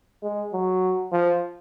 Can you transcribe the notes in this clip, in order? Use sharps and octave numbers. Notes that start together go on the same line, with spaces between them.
G#3
F#3
F3